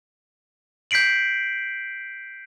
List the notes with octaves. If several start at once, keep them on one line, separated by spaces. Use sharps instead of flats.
G6 B6 C7 D7 F#7